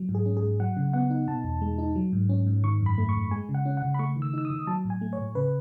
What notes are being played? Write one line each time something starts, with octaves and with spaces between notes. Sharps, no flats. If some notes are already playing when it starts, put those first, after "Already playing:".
Already playing: F#3
G#2
G#4
C#4
G#4
G#2
F#3 F#5
C#3
B3 F#5
D#4
B2 A5
E2
G#3
D#4
F#3
G#2
C#4
G#2
D#3 C#6
F#2
B5
A3
C#6
F#2
G#3 G#5
C#3
F#5
C#4
F#5
C#3
B5
A3 C#6
D#3
E6
D#4 E6
D#6
D#3
F#3 A5
A2
G#5
A3
C#5
A2
C#3 B4